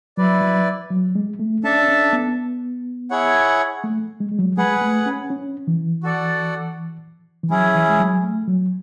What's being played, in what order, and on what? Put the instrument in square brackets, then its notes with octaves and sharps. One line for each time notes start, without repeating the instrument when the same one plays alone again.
[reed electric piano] F#3 [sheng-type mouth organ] E4 B4 D5
[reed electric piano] F#3
F#3
G#3
A3
[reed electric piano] C#4 [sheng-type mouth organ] D4 A4 E5 A5
[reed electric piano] C#4
B3
[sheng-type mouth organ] E4 G#4 C#5 F#5
[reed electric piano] A3
G#3
G#3
F#3
[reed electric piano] G#3 [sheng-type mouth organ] G#4 B4 F#5
[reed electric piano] A3
C#4
C#4
E3
[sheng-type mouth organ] F#4 A4 D5 F#5
[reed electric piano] E3
[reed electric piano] F#3 [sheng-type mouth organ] C#4 E4 G#4
[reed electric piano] E3
G#3
F#3
A3
F#3